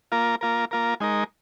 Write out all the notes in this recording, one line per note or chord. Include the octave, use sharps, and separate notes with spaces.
A#3 F4 A#4
A#3 F4 A#4
A#3 F4 A#4
G#3 D#4 A#4